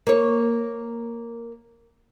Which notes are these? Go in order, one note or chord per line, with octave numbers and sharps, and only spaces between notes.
A#3 C#5